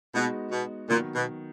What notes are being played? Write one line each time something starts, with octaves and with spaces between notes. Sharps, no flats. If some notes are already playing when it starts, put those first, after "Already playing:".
B2 G#3 B3 D#4 F#4
B2
A#2 D#3 F#3 B3 F#4
B2